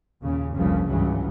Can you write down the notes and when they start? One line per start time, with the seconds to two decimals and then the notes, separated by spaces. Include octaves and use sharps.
0.22 D#2 A#2 C#3
0.54 F1 C2 G2 A#2 C#3 F3
0.85 G#1 C#2 G2 C#3 E3 F#3